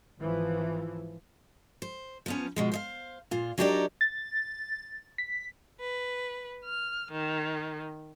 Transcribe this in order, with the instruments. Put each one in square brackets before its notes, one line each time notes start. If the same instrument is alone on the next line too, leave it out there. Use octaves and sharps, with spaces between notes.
[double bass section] G#1 E3 F3
[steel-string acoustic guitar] C5
F3 B3 C#4
B2 F3 G#3
C5 D#5 F5
A#2 F4
F#3 D4 D#4 G4 A#4 D5
[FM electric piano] A6
B6
[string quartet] B4
F6
D#3